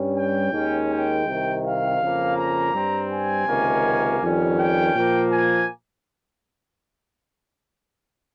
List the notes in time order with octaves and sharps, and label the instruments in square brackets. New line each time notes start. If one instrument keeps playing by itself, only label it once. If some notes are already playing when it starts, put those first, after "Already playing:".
Already playing: [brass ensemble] G2 G3 C#4
G5
D#2 D#3 G#3 C#4
G5
C2 C3 D#3
F5
F2 C#3 F3 A#3
A#5
G2 G3 C4
G#5
C#2 C3 D#3 A#3 C#4
F2 D#3 G3 C#4
G5
A#2 F3 A#3
G#5